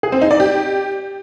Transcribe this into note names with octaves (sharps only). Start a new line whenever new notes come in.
G#4
C4
D#4
D5
G4